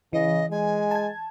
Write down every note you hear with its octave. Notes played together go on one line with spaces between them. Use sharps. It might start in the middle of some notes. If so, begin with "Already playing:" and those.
C#3 E3 D#5
G#3 G#5
A5 G#6